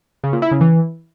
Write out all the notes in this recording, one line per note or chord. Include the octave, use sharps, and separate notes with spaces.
C#3
A#2
E4
C#3
E3